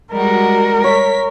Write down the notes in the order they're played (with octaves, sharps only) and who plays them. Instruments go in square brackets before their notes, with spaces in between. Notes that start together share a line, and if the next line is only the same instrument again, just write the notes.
[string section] G3 G#3 F#4 [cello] A#4
[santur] C#5 [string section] B6